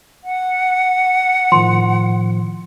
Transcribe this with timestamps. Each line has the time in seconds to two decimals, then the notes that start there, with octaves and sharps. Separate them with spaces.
0.24 F#5
1.52 A2 D#3 F3 C6